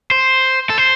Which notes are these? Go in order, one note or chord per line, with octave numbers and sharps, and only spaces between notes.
C5
A4
C5